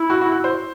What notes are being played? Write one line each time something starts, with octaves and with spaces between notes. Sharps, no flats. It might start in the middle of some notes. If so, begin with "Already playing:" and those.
Already playing: E4
F#4
F#4
F#4
C5